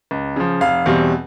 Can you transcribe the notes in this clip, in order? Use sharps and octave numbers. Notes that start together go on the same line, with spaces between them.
C#2
C#3 F3
F1 F5
E2 B2 G3 C4